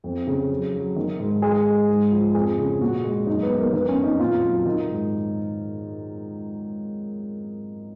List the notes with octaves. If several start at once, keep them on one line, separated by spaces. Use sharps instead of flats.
F2
C#3
F#3
F#3
D#3
G#2
G#3 G#4
G#3
G#2
F3
F2 G#4
C#3
A#2 F#4
G#3
F#2 D#4
B3
F#2
A#3
D#3 B3
C#4
F2
D#4
A#2 F4
F#3
D#3 D#4
G#2